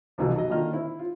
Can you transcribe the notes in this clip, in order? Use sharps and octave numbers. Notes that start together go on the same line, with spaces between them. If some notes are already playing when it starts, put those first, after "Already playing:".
C2 F2 B2 E3 F#3
F#3 D#5
A#2 D3 D#3 F4 D#5 F6
C4 E4
F4